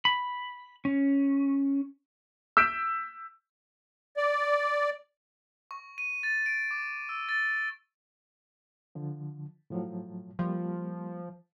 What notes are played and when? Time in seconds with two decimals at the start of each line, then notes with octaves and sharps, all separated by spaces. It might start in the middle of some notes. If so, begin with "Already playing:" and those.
0.05 B5
0.85 C#4
2.57 E6 G6 B6 D7
4.17 D5
5.71 C#6
5.98 D#7
6.23 A6
6.46 D7
6.71 D6
7.09 E6
7.29 A6
8.95 D3 F3
9.70 A2 F3 F#3
10.39 F3 G3 A#3